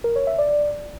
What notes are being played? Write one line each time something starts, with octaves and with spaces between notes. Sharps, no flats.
A#4
C#5
E5
D5